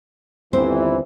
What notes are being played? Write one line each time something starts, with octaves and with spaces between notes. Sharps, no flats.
G1 D#2 E3 C4 C5